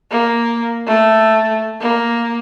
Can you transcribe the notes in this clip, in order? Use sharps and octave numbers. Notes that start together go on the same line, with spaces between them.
A#3
A3
A#3